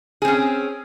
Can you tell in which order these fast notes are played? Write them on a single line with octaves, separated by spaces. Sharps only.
G#4 C4 C#4